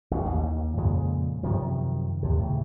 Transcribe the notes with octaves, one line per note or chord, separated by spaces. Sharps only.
A1 F#2 A#2
D#2
F2 A#2 C#3 G#3
F#2 C3 D#3 F3
D#2 C3
A2 C#3